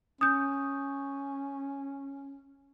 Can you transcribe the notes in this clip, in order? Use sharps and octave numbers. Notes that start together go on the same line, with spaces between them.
C#4 D#6 G6